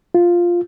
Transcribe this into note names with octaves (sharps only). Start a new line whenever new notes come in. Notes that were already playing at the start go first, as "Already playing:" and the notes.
F4